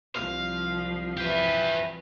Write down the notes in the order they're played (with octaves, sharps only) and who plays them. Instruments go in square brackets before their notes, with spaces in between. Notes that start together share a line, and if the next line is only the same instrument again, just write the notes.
[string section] C2 F3 [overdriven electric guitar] F5
[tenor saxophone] E3 [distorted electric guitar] G4 B4